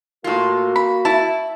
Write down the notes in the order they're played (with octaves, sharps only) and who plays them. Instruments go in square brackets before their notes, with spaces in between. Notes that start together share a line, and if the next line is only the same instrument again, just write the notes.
[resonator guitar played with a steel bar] A2 F4 [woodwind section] A#3 F#4
[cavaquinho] B5
[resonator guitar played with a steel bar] E4 [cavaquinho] A5